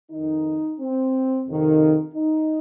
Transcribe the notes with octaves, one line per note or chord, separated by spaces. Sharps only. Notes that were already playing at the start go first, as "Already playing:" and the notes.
F2 D#3 D#4
C4
F2 C3 D#3
D#4